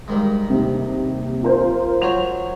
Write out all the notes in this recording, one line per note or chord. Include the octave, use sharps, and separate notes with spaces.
G2 D#3 G#3
D#2 C3
F4 A#4 C5
F#3 C5 C#5 F7